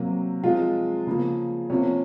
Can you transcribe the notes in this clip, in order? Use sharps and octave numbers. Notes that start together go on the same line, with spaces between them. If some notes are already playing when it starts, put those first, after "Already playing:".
Already playing: C3 F#3 A#3
C3 F3 G#3 F4
C#3 F3 A#3
C3 F3 A#3 C#4